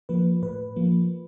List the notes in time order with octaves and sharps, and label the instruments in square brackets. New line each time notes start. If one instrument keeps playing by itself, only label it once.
[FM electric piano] F3 A#3 B4
A2 B4
F3 A#3